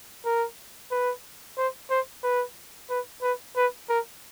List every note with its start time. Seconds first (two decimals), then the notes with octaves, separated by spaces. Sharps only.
0.25 A#4
0.91 B4
1.57 C5
1.90 C5
2.23 B4
2.90 B4
3.22 B4
3.56 B4
3.89 A#4